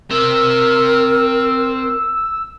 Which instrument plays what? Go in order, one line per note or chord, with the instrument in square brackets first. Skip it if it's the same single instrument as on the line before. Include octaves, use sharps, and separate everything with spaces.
[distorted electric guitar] C4 E5 [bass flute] A#4 [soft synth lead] E6